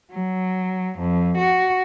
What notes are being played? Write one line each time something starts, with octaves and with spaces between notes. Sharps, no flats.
F#3
F2
F#4